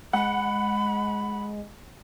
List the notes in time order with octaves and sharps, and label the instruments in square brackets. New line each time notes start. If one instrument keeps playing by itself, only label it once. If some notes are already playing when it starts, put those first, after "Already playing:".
[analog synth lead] G#3 [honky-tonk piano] F#5 [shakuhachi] B5